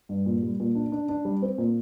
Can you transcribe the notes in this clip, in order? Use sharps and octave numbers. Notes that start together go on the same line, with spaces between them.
G2
A#2
G3
A#2
D4
D4
D4
G3
C4
A#2